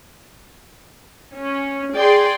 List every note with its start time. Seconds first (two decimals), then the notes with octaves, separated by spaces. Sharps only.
1.34 C#4
1.96 G#4 D5 G5 C6